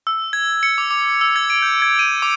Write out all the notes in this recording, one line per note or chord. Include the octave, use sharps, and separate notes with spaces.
E6
G#6
C#7
D6
D6
E6
G#6
D7
G6
G#6
D#7
D6